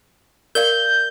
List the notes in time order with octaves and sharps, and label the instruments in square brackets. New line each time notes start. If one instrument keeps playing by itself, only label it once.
[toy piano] A#4 D5 F5 [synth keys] G6